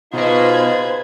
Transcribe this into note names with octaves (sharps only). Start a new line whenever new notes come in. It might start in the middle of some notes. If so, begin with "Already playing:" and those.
B2 D#4 F4 G#4 B4 C5 D#5 G#6